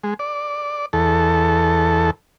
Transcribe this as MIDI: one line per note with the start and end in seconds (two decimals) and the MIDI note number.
0.04 0.14 56
0.19 0.86 74
0.93 2.11 40
0.93 2.11 69